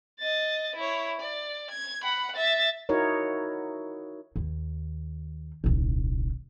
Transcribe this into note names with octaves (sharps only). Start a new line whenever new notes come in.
D#5 A6
E4 C#5
D5
G#6
F#5 B5
E5 A6
D#4 E4 F#4 A#4 C#5
D#2
D#1 C2